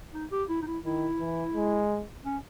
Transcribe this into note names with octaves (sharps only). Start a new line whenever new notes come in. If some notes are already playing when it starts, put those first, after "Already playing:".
D#4
G4
E4
D#4
E4
D#3 E4
E3
G#3
C#4